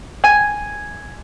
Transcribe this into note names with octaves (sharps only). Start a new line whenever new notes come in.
G#5